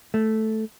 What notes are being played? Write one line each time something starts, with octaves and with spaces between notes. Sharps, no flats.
A3